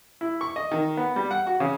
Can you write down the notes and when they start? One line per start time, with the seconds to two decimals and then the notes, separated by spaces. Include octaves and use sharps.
0.21 E4
0.41 C#6
0.56 D#5
0.71 D#3
0.97 B3
1.16 G3
1.31 F#5
1.47 F#4
1.60 C#3